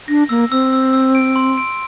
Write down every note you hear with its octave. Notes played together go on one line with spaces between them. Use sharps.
D4 A#6
A#3 E6
C4 E6
E6
E6
D7
C6
D7